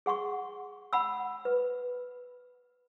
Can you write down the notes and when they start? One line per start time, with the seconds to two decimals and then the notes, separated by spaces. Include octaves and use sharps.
0.06 G#4 F#5 C6 C#6
0.93 F#5 B5 E6
1.45 B4